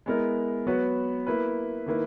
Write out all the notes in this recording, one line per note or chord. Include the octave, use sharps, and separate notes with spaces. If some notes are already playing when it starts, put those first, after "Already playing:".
G#3 B3 E4 A#4
F#3 B3 F#4 B4
A#3 E4 B4
D#3 A#3 E4 B4